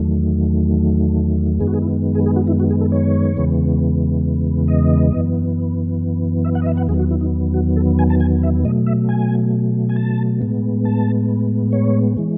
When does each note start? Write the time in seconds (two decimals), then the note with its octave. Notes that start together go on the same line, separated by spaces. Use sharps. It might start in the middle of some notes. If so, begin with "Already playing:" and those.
Already playing: E2 D#3 F#3 A3
1.60 F#2 D#3 G#3 B3 G#4
1.67 F#4
1.74 G#4
1.82 E4
2.15 G#4
2.26 G#4
2.36 F#4
2.47 E4
2.60 F#4
2.71 G#4
2.81 A4
2.92 C#5
3.36 E2 C#3 E3 G#3 B3
4.68 D#5
5.12 F#2 E3 B3
6.44 E5
6.55 F#5
6.62 D#5
6.67 E5
6.77 F#5
6.89 E2 D#3 F#3 B3 G#4
6.99 F#4
7.11 E4
7.21 D#4
7.54 F#4
7.76 A4
7.99 G#5
8.10 A5
8.20 G#5
8.43 E5
8.64 B2 F#3 A3 D#5
8.86 E5
9.09 G#5
9.89 G#5
9.96 A5
10.41 A2 G#3 B3
10.85 A5
11.73 C#5
12.17 E3 G#3